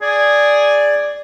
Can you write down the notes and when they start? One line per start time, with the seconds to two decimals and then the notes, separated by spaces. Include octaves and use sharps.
0.02 G#4 D5